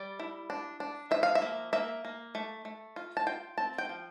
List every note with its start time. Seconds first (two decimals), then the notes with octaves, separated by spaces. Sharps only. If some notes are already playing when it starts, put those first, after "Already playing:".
Already playing: G3 D5
0.20 E4
0.50 D4
0.80 D4
1.11 F3 E5
1.23 F5
1.35 E5
1.42 A#3
1.73 A#3 E5
2.05 A#3
2.35 A3
2.65 A3
2.96 F4
3.17 A5
3.26 F4 G5
3.58 C4 A5
3.78 G5
3.89 F3